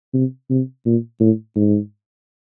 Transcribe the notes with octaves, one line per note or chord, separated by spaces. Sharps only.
C3
C3
A#2
A2
G#2